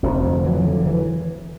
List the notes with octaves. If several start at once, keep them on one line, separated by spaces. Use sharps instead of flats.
F1 F2 D3 F3
E3 F#3
D3
E3